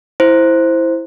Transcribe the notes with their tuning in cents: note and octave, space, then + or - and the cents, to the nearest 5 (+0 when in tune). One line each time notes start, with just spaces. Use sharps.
E4 +0 C5 +0